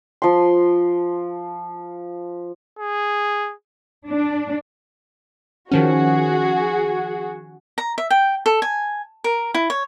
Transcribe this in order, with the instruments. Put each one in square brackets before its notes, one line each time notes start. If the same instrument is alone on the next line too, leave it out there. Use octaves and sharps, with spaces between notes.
[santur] F3 C6
[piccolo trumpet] G#4
[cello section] D4
[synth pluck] D#3 F3 C#4 [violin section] F#4 G#4
[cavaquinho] A#5
E5
G5
A4
G#5
A#4
E4
C#5